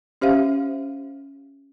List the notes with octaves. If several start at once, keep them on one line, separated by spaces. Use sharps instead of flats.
C#4 G4 C5 E5 F5